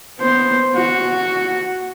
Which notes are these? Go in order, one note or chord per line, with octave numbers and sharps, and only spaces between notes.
B3 C5
F#4